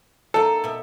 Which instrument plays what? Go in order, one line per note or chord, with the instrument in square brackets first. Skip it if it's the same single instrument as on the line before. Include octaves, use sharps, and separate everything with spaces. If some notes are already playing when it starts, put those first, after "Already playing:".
[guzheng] A#3 D#4 [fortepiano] A4
[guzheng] B2 E5